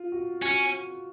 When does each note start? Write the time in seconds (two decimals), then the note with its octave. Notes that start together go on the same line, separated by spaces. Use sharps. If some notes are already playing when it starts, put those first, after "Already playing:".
Already playing: F4
0.12 F#4
0.42 C#4 F#4